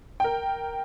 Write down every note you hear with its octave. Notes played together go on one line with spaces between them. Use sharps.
A#4 G5